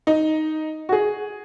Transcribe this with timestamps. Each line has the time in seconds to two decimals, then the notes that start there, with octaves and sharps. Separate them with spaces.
0.07 D#4
0.89 F#4
0.92 G#4